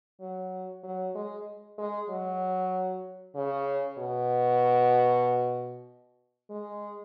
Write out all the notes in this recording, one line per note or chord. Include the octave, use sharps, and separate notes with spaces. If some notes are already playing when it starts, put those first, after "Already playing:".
F#3
F#3
G#3
G#3
F#3
C#3
B2
G#3